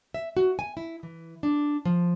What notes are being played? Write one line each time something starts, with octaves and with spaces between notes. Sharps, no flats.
E5
F#4
G#5
E4
E3
D4
F3